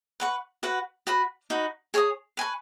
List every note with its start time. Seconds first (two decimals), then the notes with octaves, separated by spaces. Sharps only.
0.20 B4 F#5 C#6
0.63 F#4 B4 F#5
1.07 F#4 B4 F#5 B5
1.50 D#4 F#4 B4
1.94 G#4 C#5 G#5 D#6
2.37 B4 G#5 C#6